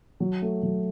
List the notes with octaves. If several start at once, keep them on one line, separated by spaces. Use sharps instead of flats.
F#3
A3
F#3